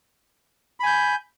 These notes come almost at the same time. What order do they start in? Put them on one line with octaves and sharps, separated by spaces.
B5 G#5 G6